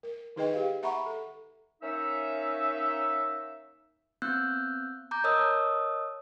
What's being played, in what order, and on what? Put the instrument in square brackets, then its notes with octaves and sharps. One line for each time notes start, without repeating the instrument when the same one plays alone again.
[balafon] A#4
D#3 D#4 G#4 B4 D#5 G5
G4 F5
E5 F#5 A#5 B5 C#6
A4
[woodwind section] A#3 C#4 D#4 E5
[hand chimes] B3 C4 E6 F#6 G6
A#5 D6 G6
A#4 C#5 D#5 A5 D#6 E6